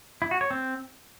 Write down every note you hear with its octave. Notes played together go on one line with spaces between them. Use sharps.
E4
F#4
C#5
C4